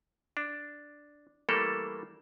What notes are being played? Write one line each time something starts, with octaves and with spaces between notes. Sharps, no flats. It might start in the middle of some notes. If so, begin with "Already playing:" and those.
D4
E3 G3 A3 A#3 A4 A#4